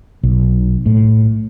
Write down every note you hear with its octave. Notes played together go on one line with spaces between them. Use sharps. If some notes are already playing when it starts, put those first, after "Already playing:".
B1
A2